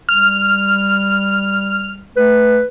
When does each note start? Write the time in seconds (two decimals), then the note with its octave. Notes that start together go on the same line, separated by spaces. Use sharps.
0.09 G3 F6
2.17 A3 B4